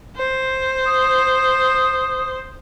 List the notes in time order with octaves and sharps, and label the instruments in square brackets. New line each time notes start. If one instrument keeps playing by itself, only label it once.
[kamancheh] C5
[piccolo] D#6